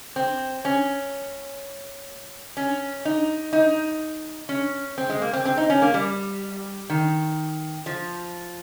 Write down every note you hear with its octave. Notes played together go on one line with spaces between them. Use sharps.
C4
C#4
C#4
D#4
D#4
C#4
C4
G#3
A#3
C4
C4
D#4
C#4
A#3
G3
D#3
F3